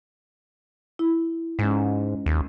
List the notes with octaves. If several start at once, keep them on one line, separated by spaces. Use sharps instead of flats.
E4
G#2 G#3 C#4
D#2